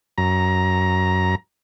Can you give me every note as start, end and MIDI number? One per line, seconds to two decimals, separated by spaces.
0.18 1.35 42
0.18 1.35 82